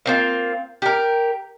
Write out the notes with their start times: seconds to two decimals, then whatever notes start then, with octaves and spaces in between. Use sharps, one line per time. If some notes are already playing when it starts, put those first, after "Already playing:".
0.06 A#3 C4 F4
0.82 G4 A#4